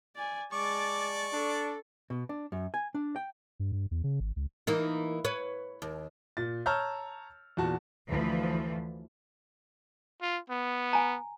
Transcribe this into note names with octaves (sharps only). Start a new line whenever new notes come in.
D5 G#5
G#3 D5 A5 C#6 D6
D4 A4
B2
D4
F#2
G#5
D4
G5
G2
G2
E2
C#3
G#1
C#2
E3 A#3 D#4
B4 C#5
D#2
A#2 A6
C#5 A5 A#5 E6 F6 G6
E2 A#2 F#4 A5
D2 E3 F3
F4
B3
G#5 A#5